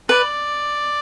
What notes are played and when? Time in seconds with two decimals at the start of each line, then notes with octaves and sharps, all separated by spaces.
0.09 B4 D5